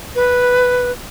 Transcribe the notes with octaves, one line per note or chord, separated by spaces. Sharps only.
B4